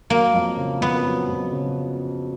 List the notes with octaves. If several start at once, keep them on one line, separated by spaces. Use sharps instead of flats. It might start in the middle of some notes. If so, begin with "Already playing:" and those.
F#3 A#3
F2
C#3
F2 B3
F#3
F2
C#3